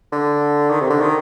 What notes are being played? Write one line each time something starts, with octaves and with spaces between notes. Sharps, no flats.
D3
D#3
C3
D3
D#3